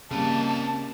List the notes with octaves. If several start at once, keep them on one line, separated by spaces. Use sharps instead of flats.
C#3 G3 A#3 C4 D#5 A5